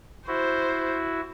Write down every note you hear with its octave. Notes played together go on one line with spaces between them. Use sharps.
E4 F#4 C5